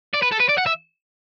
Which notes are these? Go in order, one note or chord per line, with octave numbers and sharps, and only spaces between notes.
D5
B4
A4
B4
D5
F#5
E5